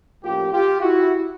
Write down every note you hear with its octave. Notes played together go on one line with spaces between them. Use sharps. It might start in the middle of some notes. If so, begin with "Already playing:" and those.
A2 F3 A#3 C#4 F4 G4
F4 G4
E4 F#4